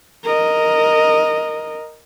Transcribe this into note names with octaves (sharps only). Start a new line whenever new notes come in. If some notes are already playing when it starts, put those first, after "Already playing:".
A#4 D#5